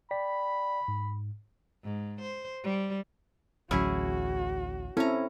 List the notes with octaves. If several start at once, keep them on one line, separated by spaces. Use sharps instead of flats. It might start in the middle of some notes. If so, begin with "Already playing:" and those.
D5 G5 B5 B6
G#2
G#2
C5
G3
A1 D2 F#3 C#4 E4 F#4 G#4
C4 C#4 E4 A4 A#5